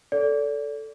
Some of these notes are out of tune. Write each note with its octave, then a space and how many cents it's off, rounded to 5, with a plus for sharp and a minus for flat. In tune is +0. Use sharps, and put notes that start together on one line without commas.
A4 +0 D5 -30